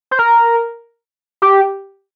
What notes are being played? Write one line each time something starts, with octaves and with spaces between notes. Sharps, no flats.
C5
A#4
G4